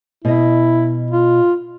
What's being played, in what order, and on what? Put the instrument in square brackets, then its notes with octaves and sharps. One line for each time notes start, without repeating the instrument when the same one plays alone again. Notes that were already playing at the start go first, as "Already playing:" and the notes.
[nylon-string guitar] B2 D#5 [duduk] E4
[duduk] F4